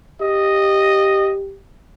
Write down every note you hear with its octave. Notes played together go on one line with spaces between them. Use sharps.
G4 D#5